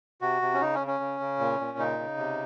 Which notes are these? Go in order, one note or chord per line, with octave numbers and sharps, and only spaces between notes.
C3 F#4
C3
C#4
C#3 D#4
C#4
C#3
C#4
C#3
C#3
A#2
A#2
C#3 D#4
C#3
C3